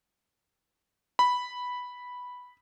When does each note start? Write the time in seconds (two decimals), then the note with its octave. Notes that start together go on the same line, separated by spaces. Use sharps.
1.19 B5